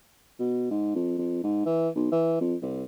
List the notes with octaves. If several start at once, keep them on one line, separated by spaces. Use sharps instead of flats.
B2
G#2
F2
F2
G#2
E3
B1
E3
F2
C2